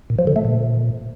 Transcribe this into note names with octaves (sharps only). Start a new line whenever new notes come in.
A#2
F3
D3
A3
A#2